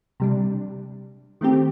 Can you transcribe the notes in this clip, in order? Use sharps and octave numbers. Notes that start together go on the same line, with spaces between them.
C3 G3 D4
D#3 A3 C4 G4